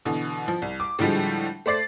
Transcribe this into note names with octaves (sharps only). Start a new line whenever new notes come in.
B2 D3 E3
F3
C2
D6
A2 D3 F3 G3 G#3
A3 C5 D5 A6 C7